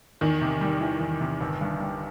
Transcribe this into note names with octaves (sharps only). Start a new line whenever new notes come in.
E2 D#3
C3
G3
E3
E2
C3
G1
G2
G3